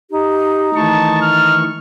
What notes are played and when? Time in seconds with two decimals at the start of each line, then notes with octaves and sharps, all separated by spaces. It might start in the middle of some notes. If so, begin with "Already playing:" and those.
0.11 D#4 G4
0.75 D#3 E3 A3 A5 C#6
1.22 F6